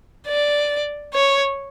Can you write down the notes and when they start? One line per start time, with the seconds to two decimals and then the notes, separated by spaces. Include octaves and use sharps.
0.27 D5
1.14 C#5